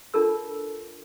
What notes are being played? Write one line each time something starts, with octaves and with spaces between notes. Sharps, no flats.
D4 F4 A4 A#4 E6